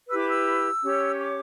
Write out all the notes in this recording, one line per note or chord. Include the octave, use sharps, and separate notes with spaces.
E4 G4 B4 E6
D6
E6
C#4 G4 C#5
D6